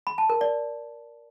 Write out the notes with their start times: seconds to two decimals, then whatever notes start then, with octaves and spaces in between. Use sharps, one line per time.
0.07 B5
0.18 A5
0.30 A#4
0.41 D5